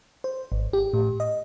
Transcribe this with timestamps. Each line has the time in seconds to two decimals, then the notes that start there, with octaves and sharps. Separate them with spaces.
0.24 C5
0.52 G#1
0.73 G4
0.93 A2
1.20 D#5